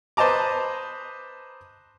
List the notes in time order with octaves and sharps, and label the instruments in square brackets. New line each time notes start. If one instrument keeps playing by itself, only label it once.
[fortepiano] B4 C5 D#5 A5 A#5 D6